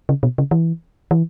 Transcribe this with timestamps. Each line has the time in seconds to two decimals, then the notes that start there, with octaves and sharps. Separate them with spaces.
0.09 C#3
0.23 B2
0.38 C#3
0.51 E3
1.11 E3